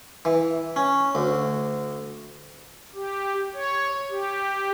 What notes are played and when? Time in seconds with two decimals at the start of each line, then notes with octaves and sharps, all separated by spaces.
0.25 E3
0.76 C#4
1.15 D2
2.94 G4
3.54 C#5
4.10 G4